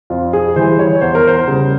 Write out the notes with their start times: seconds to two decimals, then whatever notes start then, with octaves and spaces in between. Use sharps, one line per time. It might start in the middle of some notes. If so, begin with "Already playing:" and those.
0.10 F2 F4
0.33 G#4
0.56 E3 G3 C5
0.79 C#5
1.01 E2 C5
1.15 A#4
1.27 C5
1.48 C#3 G3